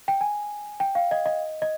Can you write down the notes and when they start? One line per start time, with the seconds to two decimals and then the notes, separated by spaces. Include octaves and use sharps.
0.08 G5
0.21 G#5
0.80 G5
0.95 F5
1.11 D#5
1.26 D#5
1.62 D#5